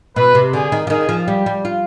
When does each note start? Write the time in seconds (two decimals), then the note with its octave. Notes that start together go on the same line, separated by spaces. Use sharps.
0.16 B2 B4
0.35 C3
0.53 D3 G#4
0.72 D#3
0.87 F3
0.90 D#3 G#4
1.09 F3
1.27 G3 G4
1.46 G3
1.65 F4